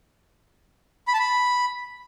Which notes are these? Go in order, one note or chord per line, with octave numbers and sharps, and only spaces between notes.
B5
A5
B5